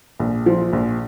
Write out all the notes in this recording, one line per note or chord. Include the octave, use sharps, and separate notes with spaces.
A#1
F3
A#1